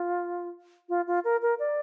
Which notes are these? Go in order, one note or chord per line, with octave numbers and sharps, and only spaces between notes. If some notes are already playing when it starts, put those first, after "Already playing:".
Already playing: F4
F4
F4
A#4
A#4
D5